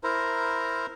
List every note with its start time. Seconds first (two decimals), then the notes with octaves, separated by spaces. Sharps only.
0.04 E4 A#4 C5 A#5